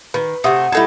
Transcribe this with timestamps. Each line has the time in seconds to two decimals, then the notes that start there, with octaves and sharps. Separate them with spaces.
0.14 D#3 B4
0.44 C3 A3 E5 F#5 D#6
0.72 G3 D#4 E4 A4 A5 G#6